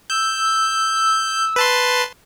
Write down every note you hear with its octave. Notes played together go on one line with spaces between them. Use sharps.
E6 G6
B4 A5 C6